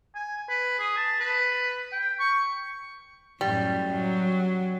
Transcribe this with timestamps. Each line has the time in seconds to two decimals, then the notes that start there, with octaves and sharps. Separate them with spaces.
0.15 G#5
0.49 B4
0.79 G#4
0.97 A5
1.20 B4
1.92 G5
2.20 C#6
3.41 F#2 A2 G3
3.93 F#3